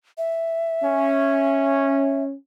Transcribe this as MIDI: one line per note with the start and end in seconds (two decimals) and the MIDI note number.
0.18 2.23 76
0.84 2.34 61